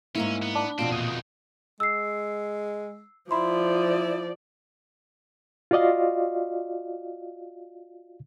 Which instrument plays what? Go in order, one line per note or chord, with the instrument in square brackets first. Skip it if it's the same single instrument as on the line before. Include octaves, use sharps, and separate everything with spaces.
[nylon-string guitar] G#2 A#3 E4 [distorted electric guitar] C#4
[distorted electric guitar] B3
[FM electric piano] D4
[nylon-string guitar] F2 B2 F4 [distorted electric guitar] C4
[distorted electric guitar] E2 D#3 [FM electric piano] A#2 D#6
[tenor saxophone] G#3 [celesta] E6 C7
[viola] F3 D5 [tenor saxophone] E4 [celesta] B5 C6
[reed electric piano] F4 F#4 D5 D#5 F5